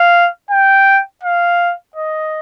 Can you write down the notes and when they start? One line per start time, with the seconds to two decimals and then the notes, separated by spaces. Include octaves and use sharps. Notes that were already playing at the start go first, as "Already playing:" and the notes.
Already playing: F5
0.51 G5
1.23 F5
1.95 D#5